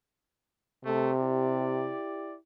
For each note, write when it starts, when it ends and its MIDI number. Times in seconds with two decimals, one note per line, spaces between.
0.85 1.93 48
0.85 1.11 57
1.20 2.35 64
1.20 2.35 67
1.20 2.35 74